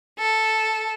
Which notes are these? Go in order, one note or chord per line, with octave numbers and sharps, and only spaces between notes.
A4